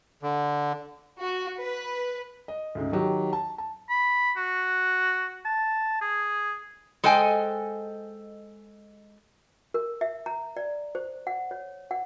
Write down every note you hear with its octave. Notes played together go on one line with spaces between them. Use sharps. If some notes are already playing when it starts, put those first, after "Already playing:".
D3
F#4
B4
D#5
D2 G#2 C#3
D#3 F#3 G4
A5
A5
B5
F#4
A5
G#4
G#3 A4 C5 D#5 G5 G#5
A#4
E5
A#5
D5
C5
F#5
C#5
F#5